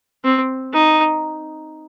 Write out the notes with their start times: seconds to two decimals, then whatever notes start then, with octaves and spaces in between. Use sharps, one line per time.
0.24 C4
0.73 D#4